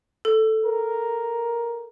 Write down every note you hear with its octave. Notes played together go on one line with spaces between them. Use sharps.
A4
A#4